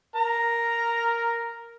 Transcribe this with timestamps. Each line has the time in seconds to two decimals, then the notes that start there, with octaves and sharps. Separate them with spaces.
0.16 A#4 A#5